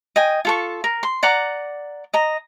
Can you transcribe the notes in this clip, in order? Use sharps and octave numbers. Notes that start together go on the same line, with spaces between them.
D#5 G5 G#5
F4 A4 C#6
A#4
C6
D5 F#5 A#5 D6
D#5 A#5